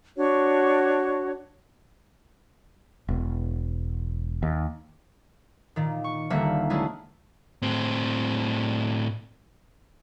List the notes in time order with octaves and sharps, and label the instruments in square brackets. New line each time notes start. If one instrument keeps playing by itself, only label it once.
[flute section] D4 F#4 C#5
[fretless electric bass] E1
D#2
[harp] A#2 D#3
C#6
D#1 D3 G3 A#3 E5 F#5
F#3 G#3 D4 E4 G#4
[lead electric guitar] A2 C4